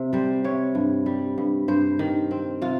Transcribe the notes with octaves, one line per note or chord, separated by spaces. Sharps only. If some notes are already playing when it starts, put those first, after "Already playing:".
Already playing: C3
G3 C5
C3 C#5
G2
G3
G2
G2 C5
D#3
C4
C3 F4